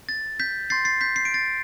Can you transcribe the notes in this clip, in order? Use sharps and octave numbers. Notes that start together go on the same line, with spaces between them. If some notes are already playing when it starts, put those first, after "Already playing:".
A6
G6 B6
C6 G6 A6 C7
A6 C7
G6 B6
C7
D7
A6 C7